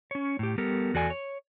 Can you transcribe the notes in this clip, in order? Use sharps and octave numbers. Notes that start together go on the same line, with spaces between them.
C#4 C#5
A2 G4
G3 B3 G4 A4 A#4
E2 F#4 A4 D5 G#5
C#5